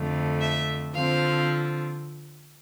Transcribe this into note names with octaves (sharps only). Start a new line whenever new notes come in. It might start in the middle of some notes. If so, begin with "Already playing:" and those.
Already playing: F2 D3 A3
E5
D3 F3 C4 F5